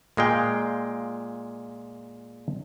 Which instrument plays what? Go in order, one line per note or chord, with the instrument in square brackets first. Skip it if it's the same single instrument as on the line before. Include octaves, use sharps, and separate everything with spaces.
[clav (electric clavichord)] A#2 G#3 F5 G5